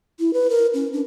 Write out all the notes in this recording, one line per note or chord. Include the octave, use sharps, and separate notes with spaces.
E4
B4
A#4
C#4
D4